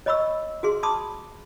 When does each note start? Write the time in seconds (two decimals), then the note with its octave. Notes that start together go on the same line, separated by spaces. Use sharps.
0.06 C#5 D#5 B5 C#6 E6
0.63 F#4 G#4 C6
0.83 A5 B5 C6 D6 D#6